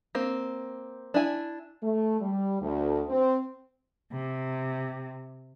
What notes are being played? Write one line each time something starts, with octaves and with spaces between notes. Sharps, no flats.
A#3 C4
D4 E4 G#5
A3
G3
D2
C4
C3